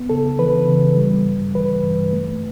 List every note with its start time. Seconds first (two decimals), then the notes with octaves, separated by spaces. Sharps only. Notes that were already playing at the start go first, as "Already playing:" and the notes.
Already playing: B3
0.10 C#3 A4
0.39 E3 B4
0.67 C#3
0.97 G3
1.26 G2
1.55 E3 B4
1.84 G2
2.13 A3